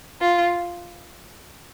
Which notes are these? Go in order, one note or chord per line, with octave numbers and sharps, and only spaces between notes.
F4